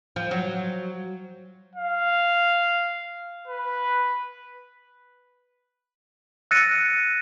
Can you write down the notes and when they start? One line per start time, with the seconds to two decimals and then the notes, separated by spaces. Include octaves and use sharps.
0.16 F3
0.31 F#3
1.75 F5
3.48 B4
6.51 E6 F#6 A6 A#6 C#7 D#7